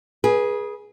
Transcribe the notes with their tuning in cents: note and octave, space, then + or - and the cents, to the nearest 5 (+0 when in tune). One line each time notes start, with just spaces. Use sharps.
G#4 +0 B4 -30